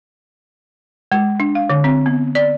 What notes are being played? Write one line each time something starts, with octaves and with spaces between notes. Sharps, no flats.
G#3
D4
F5
D3
C4
B3
D5